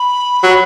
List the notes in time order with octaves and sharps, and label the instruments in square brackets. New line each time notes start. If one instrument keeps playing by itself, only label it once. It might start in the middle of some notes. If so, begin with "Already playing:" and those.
Already playing: [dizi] B5
[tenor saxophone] F#3